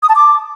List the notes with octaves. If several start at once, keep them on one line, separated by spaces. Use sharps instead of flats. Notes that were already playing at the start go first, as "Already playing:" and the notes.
D#6
A5
D6